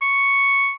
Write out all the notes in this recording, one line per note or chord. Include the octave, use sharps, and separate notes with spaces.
C#6